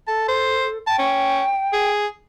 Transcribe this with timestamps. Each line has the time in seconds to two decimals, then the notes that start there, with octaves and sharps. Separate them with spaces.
0.08 A4 A5
0.28 C5
0.87 G5 A5
0.99 C#4
1.73 G#4